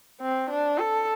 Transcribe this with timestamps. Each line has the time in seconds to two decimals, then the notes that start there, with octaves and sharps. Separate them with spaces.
0.21 C4
0.50 D4
0.78 A4